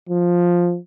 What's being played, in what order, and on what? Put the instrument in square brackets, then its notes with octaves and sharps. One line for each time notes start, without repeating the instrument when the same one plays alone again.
[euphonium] F3